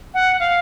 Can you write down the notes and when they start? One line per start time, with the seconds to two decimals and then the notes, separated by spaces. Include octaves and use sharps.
0.14 F#5
0.40 F5